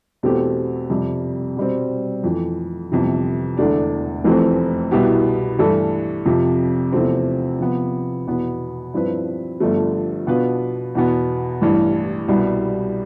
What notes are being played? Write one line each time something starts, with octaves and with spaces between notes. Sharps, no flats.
E2 B2 A3 C4 G4
F2 C3 G3
B2 G3 C4
F2 E3 A3
G1 F2 C3 E3
E1 E2 D3 A3 D4
F1 F2 E3 A3 C4
C2 B2 B3 E4 G4
G2 E3 A3 E4 A4
F2 C3 F3
E2 C3 F3 A3 C4
C3 F3 B3
E2 B2 B3
G2 F3 C4 E4 B4
G1 G2 D3 F3 A3
B2 B3 D4 F4 B4
E2 B2 B3
A1 G2 E3
C2 B2 G3 B3